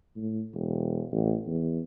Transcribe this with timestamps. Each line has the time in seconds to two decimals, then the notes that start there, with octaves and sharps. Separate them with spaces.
0.16 A2
0.53 E1
1.12 A1
1.47 E2